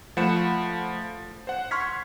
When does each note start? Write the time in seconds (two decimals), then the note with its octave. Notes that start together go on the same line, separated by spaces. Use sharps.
0.17 F3 A3 F#5 B5 C#7 E7
1.47 C5 F#5
1.71 C6 C#6 F6 G#6 B6